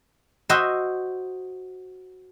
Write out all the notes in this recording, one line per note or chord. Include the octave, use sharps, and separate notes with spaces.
F#4 C5 D#5 E5